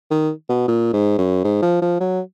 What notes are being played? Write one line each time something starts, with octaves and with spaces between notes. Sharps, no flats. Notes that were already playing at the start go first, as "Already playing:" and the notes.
D#3
B2
A#2
G#2
F#2
G#2
F3
F3
F#3